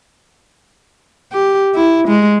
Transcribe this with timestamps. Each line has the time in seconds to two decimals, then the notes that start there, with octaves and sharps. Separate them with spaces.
1.32 G4
1.75 E4
2.08 G#3